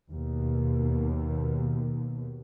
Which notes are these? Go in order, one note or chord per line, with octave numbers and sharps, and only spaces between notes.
D#2 B2